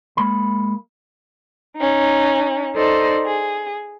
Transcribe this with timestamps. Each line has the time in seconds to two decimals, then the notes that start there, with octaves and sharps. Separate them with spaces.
0.17 G#3 A#3 B5
1.76 C#4 D#4
2.75 D#4 A4 C5 D5
3.25 G#4